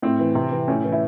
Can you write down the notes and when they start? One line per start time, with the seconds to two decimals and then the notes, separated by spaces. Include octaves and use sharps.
0.02 A2 C4
0.20 E3
0.35 C3
0.52 E3
0.68 A2 C#4
0.84 E3
0.92 E4